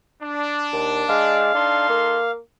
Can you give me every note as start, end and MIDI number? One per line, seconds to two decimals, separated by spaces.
0.22 1.48 62
0.73 1.04 39
1.09 1.54 56
1.09 2.31 77
1.54 1.87 62
1.54 2.20 63
1.54 2.20 69
1.54 2.20 84
1.89 2.37 58